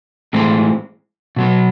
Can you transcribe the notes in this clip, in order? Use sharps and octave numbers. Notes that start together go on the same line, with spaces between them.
A2 E3 G#3 C4
B2 F#3 B3